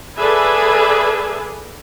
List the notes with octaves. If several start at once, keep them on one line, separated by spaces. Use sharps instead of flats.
G#4 A4 B4 D5 E5 G#5